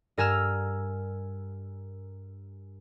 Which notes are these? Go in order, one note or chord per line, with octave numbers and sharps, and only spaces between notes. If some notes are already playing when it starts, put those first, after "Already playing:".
G2 A#4 G#5 E6 F6 E7